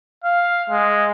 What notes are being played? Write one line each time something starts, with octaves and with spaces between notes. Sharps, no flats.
F5
G#3